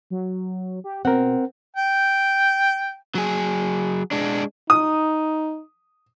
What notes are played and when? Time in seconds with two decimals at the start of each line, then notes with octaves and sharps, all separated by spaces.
0.10 F#3
0.84 G4
1.05 B2 C4 A#4 F#5
1.76 G5
3.15 F#3 G#4
4.11 G#3 D4
4.70 D#4 D#6